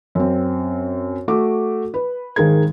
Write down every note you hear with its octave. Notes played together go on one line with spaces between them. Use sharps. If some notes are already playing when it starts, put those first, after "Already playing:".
F#2 C4
A3 F#4 D6
B4
G#1 D#3 G#3 A#4 G#6